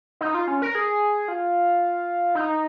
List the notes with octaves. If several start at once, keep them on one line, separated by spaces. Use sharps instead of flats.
D#4
F4
C#4
A#4
G#4
F4
D#4